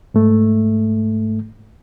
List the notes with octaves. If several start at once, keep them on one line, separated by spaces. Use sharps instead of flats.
G#2 A3